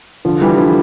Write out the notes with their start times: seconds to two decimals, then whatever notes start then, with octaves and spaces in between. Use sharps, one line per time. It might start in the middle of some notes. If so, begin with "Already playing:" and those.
0.25 D3 F3
0.41 E3 G3
0.58 D3 F3